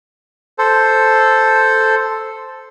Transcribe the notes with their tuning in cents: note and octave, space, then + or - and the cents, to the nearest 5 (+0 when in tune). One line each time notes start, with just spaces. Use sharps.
A4 +0 C5 +0